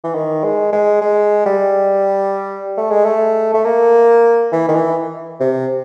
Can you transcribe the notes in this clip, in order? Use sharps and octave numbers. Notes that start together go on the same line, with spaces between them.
E3
D#3
G#3
G#3
G#3
G3
A3
G#3
A3
A3
A#3
E3
D#3
E3
C3